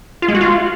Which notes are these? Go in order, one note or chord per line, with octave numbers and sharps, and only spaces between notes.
F4
G#3
F#4
F4